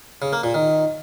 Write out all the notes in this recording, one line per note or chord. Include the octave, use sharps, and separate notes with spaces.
C#3
A#3
A#2
D#3